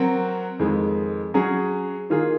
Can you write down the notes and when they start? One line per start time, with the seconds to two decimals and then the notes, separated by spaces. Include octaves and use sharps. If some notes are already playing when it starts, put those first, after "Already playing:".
Already playing: F#3 C4 F#4 A#4
0.59 F2 D#3 G#3
1.34 F#3 C#4 G#4
2.10 D#3 A#3 F4 G#4